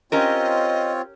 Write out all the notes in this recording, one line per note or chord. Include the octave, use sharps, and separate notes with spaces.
C4 C#4 F4 G4 A#4 C#5 D#5